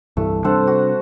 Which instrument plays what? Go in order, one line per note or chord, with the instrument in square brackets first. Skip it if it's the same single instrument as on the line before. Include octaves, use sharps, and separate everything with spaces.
[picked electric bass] C2 G2 E3 [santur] A3
[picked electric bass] C3 G3 D4 [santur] A4 C5 F#5
[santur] F#4